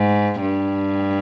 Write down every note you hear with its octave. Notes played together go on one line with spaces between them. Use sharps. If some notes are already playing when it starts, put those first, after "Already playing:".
Already playing: G#2
G2